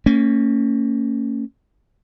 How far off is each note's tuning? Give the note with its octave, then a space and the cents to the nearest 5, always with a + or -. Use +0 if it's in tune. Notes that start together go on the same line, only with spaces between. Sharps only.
A#3 -40 C#4 +0